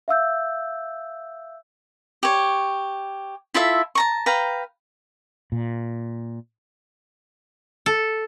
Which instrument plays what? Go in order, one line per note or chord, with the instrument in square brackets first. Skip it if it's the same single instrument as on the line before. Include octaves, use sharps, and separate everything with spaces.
[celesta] E5 F5 E6 G6
[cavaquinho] G4 C#5
E4 F4 A4 E5
A5 A#5 C#6
B4 F5 G5 A#5
[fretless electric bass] A#2
[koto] A4